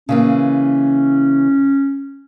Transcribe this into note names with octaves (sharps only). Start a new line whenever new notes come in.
C#3 E3 A#3 C#4